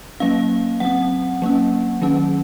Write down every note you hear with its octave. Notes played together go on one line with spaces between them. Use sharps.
F#3 A#3 C#4 F5
F#3 C4 F#5
F#3 A#3 C#4
D#3 F#3 C#4